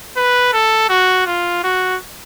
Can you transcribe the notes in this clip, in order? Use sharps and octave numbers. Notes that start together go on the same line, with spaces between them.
B4
A4
F#4
F4
F#4